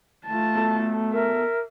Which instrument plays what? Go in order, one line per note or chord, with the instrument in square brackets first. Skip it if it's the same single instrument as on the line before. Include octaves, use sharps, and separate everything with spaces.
[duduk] A3 [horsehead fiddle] F4 A5
[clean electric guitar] B2 A4
[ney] A#4 [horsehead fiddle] E5